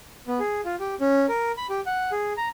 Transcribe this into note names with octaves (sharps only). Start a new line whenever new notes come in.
B3
G#4
F4
G4
C#4
A#4
B5
G4
F#5
G#4
A#5